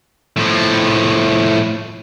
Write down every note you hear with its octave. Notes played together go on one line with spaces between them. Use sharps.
A2 F3